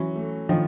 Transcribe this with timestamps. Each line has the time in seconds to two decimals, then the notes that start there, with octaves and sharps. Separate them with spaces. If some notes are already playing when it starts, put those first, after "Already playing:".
Already playing: E3 F#3 C#4
0.16 A3
0.49 D#3 F3 F4